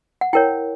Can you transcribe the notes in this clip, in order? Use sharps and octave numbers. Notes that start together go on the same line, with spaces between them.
F#5
E4 A#4 C#5 G5